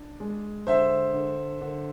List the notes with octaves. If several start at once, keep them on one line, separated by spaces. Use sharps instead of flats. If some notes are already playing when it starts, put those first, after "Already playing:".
Already playing: D4
G#3
D3 C5 E5
D3
D3